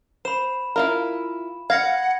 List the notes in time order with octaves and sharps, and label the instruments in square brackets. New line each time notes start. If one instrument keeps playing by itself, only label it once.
[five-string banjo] C5 [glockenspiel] B5 E7
[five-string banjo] E4 F4 A#4
[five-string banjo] F5 [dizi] F#5 [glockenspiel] G#6 A#6 C#7